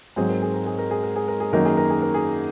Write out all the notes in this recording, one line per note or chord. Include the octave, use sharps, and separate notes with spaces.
G#2 F#3 C4 G#4
A#4
G#4
A#4
G#4
A#4
G#4
A#4
G#4
A#4
G#4
F#2 D#3 F#3 A#3 D#4 A#4
G#4
A#4
G#4
A#4
G#4